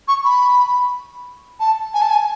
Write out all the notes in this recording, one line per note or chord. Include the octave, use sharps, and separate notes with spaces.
C#6
B5
A5
G#5
A5
G#5